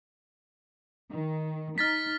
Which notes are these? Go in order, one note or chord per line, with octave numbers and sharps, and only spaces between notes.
D#3
D#4 F6 A6 B6